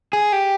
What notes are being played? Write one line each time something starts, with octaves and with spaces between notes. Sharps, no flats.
G#4
G4